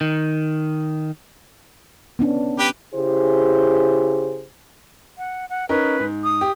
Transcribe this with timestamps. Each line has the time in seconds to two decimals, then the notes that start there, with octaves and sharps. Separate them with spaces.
0.01 D#3
2.19 B3 C#4 D4
2.59 G4 B4
2.94 C#3 E4 G4 G#4 C5
5.18 F#5
5.50 F#5
5.69 C#4 D#4 A#4 B4
6.00 G#2
6.24 D#6
6.41 G4